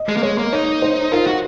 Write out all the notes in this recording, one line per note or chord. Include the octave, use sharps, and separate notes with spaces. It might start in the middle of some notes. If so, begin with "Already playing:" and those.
Already playing: D#5
G#3
A#3
G#3 C#5
A#3
D#4 C#5
C5
F4 A#4
F#4